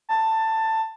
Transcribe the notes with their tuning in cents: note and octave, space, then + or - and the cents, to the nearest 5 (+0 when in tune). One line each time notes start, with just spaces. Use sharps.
A5 +15